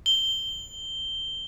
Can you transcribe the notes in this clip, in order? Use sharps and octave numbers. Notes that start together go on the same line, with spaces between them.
G7